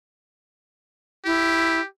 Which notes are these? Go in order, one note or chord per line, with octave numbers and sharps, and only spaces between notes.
E4 G4